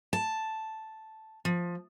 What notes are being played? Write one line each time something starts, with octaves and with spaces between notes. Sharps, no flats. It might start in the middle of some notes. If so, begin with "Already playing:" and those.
A5
F3